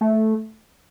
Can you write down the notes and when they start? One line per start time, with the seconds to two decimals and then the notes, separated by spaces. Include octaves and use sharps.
0.01 A3